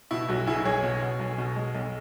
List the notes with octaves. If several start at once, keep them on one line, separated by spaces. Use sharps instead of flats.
B2 E4
B1 F#4
B2 E4 G#4
B1 G#4 C#5
B2
B2
B1
B2
G#3
B1